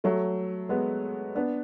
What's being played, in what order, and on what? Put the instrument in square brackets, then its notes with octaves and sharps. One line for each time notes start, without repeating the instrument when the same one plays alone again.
[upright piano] F#3 A3
G#3 B3
B3 D4